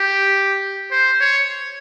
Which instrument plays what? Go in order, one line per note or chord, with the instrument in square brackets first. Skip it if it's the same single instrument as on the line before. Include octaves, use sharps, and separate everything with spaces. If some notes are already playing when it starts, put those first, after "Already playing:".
Already playing: [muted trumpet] G4
C5
C#5